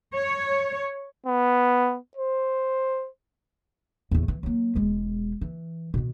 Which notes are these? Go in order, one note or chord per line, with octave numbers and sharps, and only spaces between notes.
C#5
B3
C5
E2 A2
E3
F#3 A#3
E1 G#3
E3
B2 D#3